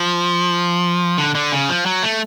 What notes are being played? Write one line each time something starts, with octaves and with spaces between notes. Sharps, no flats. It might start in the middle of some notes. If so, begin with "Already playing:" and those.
Already playing: F3
D3
D3
C#3
F3
F#3
A3